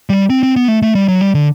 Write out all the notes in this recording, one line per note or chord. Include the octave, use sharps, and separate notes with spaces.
G3
C4
C4
B3
A3
A3
G3
F#3
G3
D3